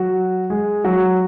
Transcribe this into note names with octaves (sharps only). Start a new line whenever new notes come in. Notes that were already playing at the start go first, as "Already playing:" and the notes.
Already playing: F#3 F#4
G#3 G#4
F#3 F#4